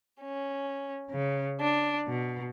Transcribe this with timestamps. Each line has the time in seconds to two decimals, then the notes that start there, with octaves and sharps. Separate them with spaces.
0.22 C#4
1.11 C#3
1.61 D4
2.07 B2